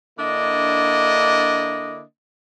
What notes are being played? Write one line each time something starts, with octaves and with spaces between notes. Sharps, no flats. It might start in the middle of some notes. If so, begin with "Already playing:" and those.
D3 A#3 D4 E4 D#5